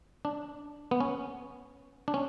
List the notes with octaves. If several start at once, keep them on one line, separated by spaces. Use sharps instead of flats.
D4
B3
C#4
D4
C#4